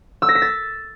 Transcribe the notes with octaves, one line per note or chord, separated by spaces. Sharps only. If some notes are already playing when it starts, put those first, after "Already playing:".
E6
A#6
B6
A6